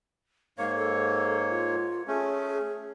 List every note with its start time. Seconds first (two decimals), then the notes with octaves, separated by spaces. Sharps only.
0.58 G#2 A#3 C#5 F5
0.77 A4
1.50 F4
2.07 A3 C#4 G#4